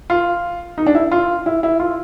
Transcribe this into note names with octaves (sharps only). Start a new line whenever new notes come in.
F4
D#4
D4
E4
F4
E4
E4
F4